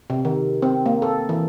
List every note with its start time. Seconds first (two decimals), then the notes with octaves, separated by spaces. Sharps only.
0.10 C3
0.25 D#3
0.62 C4
0.86 A#3
1.02 A4
1.29 E3